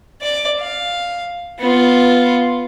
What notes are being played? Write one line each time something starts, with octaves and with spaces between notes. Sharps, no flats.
D5 D6
F5
B3 F4